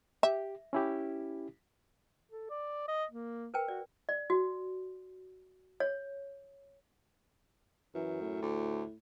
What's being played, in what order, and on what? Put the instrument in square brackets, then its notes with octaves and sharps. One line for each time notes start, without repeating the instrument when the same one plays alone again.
[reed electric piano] G4 [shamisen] E5
[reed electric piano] C#4 E4 G4
[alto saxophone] A4
D5
D#5
A#3
[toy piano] A#4 B4 G5
[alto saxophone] F#4 [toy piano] D5
[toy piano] D5
F#4
C#5
[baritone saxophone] F#2 [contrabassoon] E3
[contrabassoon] A2
[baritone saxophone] D2